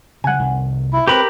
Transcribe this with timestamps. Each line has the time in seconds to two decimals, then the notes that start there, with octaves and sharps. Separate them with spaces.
0.24 C#3 G3 F#5 G#5
0.39 C2 D#3
0.93 E4
1.08 C4 G4 A#4 B4 B5